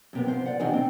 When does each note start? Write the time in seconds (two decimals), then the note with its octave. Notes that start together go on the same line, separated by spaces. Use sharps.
0.13 F#2 C3 B3
0.26 F3 C5
0.46 D5 F#5
0.60 C3 D#3 F3 D4 D#5 G#5
0.73 C4